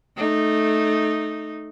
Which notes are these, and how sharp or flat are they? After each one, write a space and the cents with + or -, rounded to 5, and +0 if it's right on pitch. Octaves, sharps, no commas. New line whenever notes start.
A3 -10 D#4 -10